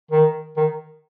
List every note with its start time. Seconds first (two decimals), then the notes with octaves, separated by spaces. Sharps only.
0.11 D#3
0.57 D#3